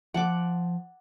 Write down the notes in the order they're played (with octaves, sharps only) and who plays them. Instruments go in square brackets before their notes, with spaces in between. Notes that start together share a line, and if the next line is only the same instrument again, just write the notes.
[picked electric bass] F3 [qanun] F#5 A5 D6